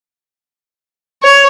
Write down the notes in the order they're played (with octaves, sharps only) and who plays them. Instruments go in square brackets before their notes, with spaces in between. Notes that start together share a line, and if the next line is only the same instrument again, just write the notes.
[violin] C#5